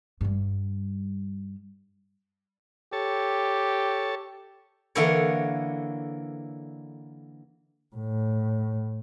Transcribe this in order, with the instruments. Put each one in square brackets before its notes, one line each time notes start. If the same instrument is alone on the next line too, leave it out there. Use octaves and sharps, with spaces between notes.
[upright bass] G2 G3
[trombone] G4 [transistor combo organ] A4 C#5 A5
[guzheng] D3 E3 A#3 E4 A#4 C#5
[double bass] A2